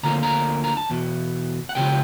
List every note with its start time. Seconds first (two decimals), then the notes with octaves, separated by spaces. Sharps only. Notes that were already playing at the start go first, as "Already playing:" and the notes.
0.03 D2 D3 F3 A#3 A#5
0.23 A#4 A#5
0.64 A#5
0.77 A5
0.90 E2 B2
1.69 F#5
1.75 C#2 C#3 F3 G4 G5